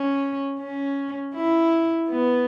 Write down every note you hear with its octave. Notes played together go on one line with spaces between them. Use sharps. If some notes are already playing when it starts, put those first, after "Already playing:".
Already playing: C#4
C#4
E4
B3